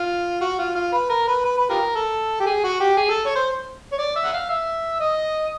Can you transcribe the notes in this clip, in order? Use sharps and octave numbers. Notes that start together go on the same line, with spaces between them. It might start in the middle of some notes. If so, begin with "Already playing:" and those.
Already playing: F4
F#4
F4
F4
B4
A#4
B4
B4
B4
F4 G4 A#4
A4
G4
G#4
F#4
G4
G#4
A4
C#5
C5
C#5
D5
E5
F#5
F5
E5
D#5